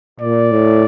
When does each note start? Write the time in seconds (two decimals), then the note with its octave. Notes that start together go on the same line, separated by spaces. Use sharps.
0.20 A#2 D5
0.52 A2